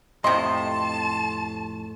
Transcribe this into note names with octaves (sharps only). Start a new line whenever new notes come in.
F2 A2 C3 D#5 A5 C6